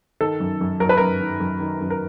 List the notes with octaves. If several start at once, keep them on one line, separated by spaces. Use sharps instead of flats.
D#3 A4
F#2
F#2
F#3 A#4
B4
F#2 A#4
D#3
F#2
D#3
F#2
A#4